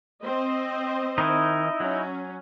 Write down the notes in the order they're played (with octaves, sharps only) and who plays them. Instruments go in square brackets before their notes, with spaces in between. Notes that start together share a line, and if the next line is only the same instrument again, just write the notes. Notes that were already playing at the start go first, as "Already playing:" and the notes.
[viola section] C4 C5 D#5
[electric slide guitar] D#3 [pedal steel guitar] D#4 E4
[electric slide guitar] F#3 [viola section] C#4